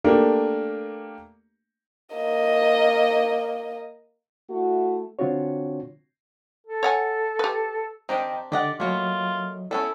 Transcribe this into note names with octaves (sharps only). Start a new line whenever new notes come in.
A3 A#3 D4 G4 A#4
A#3 D#5
A3 E4 F#4
D3 C4 D4 F4 F#4 C#5
A4
C#5 F#5 G#5
G4 B4
C4 D4 G4 D#5 G5 A#5
D3 G4 D5 D#5 F#5
F#3 A3 A#3 F4 C#5 D#5
G3 B3 C#4 E4 A4